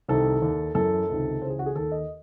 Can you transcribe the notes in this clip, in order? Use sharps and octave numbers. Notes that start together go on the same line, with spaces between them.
C2 C3 D#3 A4
D#2 D#3
F#2 E3 A4
C#2 C3 D#3
C#2 C#3 E3 C5
G#4
F#4
G#4
D#2 D#3 A4
D#5